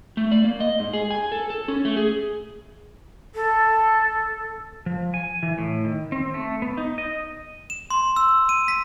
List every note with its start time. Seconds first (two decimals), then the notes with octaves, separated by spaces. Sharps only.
0.17 A3
0.31 D5
0.44 A#3
0.60 D#5
0.80 G#2
0.93 G#4
1.11 G#5
1.32 A4
1.50 A4
1.68 C#4
1.85 A3
1.97 G#4
3.34 A4
4.86 F3
5.14 G#5
5.43 E3
5.58 A2
5.85 D#3
6.12 C4
6.34 A3
6.62 B3
6.77 D#4
6.98 D#5
7.70 E7
7.90 C6
8.16 E6
8.49 D#7
8.68 B6